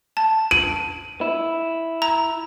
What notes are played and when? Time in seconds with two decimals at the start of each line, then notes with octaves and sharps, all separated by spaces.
0.17 A5
0.51 D#7 F#7
1.21 E4
2.02 A#5